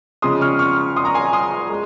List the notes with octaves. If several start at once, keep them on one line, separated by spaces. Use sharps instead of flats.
C#3 F3 G#3 C6 D#6
C#6 F6
C#6 F6
C6 D#6
A#5 C#6
G#5 C6
C6 D#6
G#3